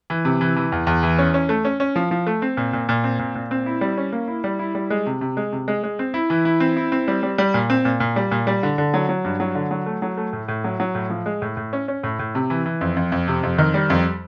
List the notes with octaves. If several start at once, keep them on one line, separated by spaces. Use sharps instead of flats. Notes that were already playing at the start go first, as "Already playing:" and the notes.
E3
C3
E3
E3
E2
E2
E3
C#4
C#4
A3
C#4
C#4
F3
F3
A3
C4
A#2
A#2
A#2
C4
A#2
A#2
C4
E4
G3
C#4
A#3
E4
G3
E4
G3
G#3
C3
C3
G#3
C3
G#3
G#3
C4
E4
E3
E4
C4
E4
C4
G3
G3
G3
A#2
C4
A#2
A#2
G3
A#2
G3
D3
D3
F#3
F#3
G2
F#3
D3
F#3
A3
F#3
A3
A2
A2
F#3
F#3
A2
F3
G#3
A2
A2
C#4
C#4
A2
A2
C3
E3
E3
F2
F2
F2
C3
F2
D#3
G3
F2